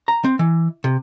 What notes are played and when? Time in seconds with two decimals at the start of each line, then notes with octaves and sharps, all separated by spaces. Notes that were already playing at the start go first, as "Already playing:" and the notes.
0.08 A#5
0.24 C4
0.39 E3
0.84 C3